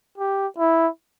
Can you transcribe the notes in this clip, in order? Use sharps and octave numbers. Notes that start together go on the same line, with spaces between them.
G4
E4